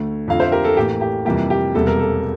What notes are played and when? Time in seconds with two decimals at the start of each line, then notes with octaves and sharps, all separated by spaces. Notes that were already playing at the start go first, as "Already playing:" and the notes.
Already playing: D2 D3 A3
0.28 F2 D3 F3 F5
0.40 C5 E5
0.52 G4 A#4
0.64 A4
0.76 A1 A2 E3 A#3 G4
1.01 G4
1.25 F2 C3 E3 G3 A#3 G4
1.50 G4
1.75 E1 E2 C3 G3 A#3 A4
1.87 A#4
1.99 A4